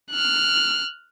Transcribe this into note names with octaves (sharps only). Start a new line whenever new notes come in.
F6 F#6